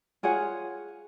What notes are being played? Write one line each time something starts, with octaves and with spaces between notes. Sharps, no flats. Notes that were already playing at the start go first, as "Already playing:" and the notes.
F4 G#4 C#5 F#5